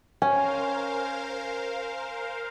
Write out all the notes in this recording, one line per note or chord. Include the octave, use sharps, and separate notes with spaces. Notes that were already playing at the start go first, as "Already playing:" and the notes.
C#4 A#4 C5 F5 G#5